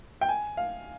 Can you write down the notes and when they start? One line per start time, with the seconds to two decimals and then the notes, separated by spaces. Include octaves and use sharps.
0.21 G5
0.29 G#5
0.57 F5